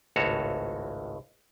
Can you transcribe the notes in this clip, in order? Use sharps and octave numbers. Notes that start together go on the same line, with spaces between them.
G#1 C#2 A2 F#4 A4 C#5